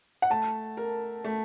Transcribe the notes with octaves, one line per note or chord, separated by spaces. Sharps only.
F#5
A3 A5
A#4
A3